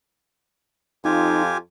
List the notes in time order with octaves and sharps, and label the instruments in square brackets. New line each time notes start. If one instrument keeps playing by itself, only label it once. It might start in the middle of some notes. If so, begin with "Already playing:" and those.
[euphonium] F2 [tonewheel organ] D#4 [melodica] F4 G4 G#5